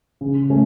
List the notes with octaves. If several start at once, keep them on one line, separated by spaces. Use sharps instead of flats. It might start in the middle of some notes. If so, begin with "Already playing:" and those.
C#3
A3 C#4